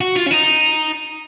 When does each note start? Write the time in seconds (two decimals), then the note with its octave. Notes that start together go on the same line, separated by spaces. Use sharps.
0.01 F#4
0.16 F4
0.26 C#4
0.31 D#4